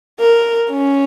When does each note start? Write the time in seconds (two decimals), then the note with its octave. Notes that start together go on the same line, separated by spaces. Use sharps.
0.20 A#4
0.71 C#4